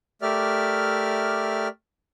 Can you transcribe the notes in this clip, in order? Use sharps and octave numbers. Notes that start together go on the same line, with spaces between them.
A3 G4 A#4 D5 E5 F6